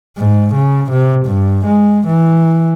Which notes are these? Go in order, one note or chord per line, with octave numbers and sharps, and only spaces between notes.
G#2
C#3
C3
G2
G#3
E3